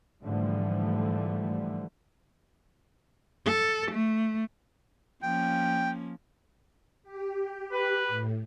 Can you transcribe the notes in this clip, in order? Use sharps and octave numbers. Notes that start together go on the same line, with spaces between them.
G#2 D3 E3 F3 G3 A3
A4
A3
F3 A#3 C#4 G5
G4
B4
A2